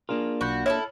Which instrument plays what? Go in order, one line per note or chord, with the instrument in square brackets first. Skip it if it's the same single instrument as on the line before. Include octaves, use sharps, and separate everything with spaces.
[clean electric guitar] A#3 D4 F4 [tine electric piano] G#4 A#4
[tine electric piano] B1 B5 G6 [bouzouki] F#4
[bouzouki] E4 G#4 A4 [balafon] C#5 [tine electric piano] F6